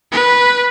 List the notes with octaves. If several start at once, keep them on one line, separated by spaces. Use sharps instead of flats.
B4